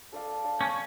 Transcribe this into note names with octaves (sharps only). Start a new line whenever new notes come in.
D4 A4 D5 F5
D4 A4 D5 F5
C#4